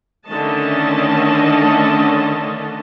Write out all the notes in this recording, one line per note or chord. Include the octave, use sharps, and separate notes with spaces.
D3 D#3 A3 C#4 D#5 A5